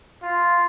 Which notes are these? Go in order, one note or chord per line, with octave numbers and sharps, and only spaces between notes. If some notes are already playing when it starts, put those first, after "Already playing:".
F4